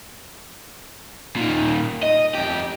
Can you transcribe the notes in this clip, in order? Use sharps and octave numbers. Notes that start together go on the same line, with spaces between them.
A#2 D#3
D#5
F2 G4